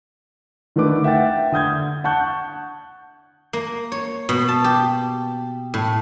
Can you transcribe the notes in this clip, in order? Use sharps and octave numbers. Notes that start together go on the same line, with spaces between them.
D3 D#3 A3 D4 B4 D6
E5 F#5 G5 A6
D3 D#6 G6 G#6
F#5 A5 C#6 F#6 G6
A#3
C#5
B2
A5
G4
A2